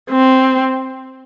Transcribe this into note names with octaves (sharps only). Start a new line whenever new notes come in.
C4